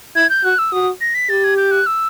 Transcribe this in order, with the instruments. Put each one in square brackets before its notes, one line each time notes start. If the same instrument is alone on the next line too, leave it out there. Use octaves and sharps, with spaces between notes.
[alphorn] E4 [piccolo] G#6
[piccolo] G6
[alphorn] F#4 [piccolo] F#6
[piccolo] E6
[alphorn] F#4 [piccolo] D#6
[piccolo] A#6
B6
[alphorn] G4 [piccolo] A6
[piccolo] G#6
G6
F#6
E6